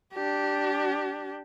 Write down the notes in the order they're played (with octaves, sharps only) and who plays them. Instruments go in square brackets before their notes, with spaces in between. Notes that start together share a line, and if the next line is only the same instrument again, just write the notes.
[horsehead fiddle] D4 G4